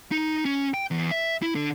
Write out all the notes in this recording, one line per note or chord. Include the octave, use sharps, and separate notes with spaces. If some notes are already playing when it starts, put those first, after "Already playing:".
D#4
C#4
G5
E2
E5
E4
D3